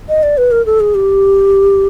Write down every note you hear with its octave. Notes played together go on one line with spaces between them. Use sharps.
D#5
D5
B4
A#4
A4
G#4
G4